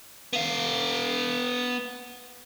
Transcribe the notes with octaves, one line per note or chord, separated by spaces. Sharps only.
B3 F5